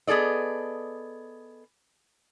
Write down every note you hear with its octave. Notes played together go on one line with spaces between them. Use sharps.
B3 G#4 A4 D5 D#5